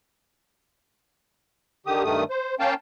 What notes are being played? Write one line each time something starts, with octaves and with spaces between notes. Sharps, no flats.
D3 D#3 G4 D#6
G2 D#3 A3 D#6
C5
A#3 C#4 F5 G5 A5